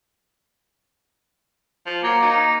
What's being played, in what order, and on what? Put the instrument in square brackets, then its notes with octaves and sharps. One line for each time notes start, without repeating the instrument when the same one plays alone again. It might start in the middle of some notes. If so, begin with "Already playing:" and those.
[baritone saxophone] F3
[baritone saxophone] F#3 [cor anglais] A#3
[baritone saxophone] D#4